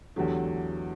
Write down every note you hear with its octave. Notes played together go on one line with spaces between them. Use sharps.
E2 D3 F#3 A3 G4